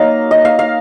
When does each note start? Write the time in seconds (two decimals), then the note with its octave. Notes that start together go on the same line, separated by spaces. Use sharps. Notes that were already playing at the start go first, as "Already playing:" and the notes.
Already playing: F#3 A#3 D#4 D#5 F5
0.31 D#5
0.45 F5
0.59 F5